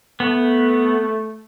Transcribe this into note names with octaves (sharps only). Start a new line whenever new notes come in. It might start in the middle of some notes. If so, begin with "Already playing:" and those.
A3 B3